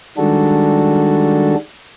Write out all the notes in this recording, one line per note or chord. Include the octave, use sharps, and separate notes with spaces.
D#3 G3 G#3 D4 F#4 A4